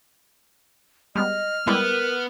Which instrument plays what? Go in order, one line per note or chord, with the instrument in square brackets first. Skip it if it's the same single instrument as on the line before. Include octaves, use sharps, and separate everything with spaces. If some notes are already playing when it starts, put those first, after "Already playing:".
[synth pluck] G3 G#3 B3 [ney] D#5 [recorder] F6
[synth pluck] G3 G#3 E4 [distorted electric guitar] B3 [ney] A#4